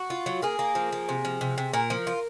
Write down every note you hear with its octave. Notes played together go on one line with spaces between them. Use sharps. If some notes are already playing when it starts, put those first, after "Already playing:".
Already playing: F#4
F4
F#3
A#3 G#4
A#3
F3
A#3
C3
F3
C3
C3
A#2 A#4
F3
F4